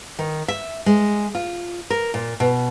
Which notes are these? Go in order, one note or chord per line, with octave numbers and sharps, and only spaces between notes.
D#3
E5
G#3
F4
A#4
A#2
B2